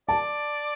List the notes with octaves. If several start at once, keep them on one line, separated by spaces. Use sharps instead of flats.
D5 A5